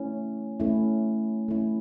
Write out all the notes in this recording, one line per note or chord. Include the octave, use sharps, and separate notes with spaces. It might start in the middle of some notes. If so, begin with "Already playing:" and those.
Already playing: A3 C#4 E4
A3 C#4 E4
A3 C#4 E4